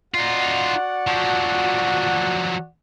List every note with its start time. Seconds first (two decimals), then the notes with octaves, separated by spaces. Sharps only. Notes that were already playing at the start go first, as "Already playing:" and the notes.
0.14 D#4 F4 F#4 D5 F#5
1.07 F3 F#3